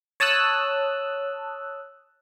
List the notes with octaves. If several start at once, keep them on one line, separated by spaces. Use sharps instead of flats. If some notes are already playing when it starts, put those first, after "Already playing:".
C#5 A5 D#6 E6 F#6